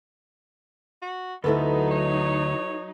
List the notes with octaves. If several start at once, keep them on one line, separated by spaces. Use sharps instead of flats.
F#4
D2 F#3 B3 D#4 E4 A4 B4
C#5